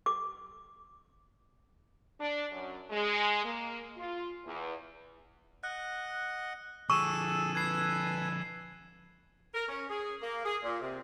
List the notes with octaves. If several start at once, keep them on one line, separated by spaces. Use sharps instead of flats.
D6
D4
F#2
G#3
A#3
F4
E2
D#5 F#5 F#6
D3 F3 G#4 A4 C#6 E6 D#7 E7
A4 B4 G#5 G#6 C7
A#4
C#4
G#4
A#3
G#4
A#2
C3